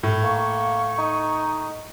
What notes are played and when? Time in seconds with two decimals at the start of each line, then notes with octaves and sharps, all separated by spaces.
0.03 A2
0.24 A#3 C#6
0.98 D#4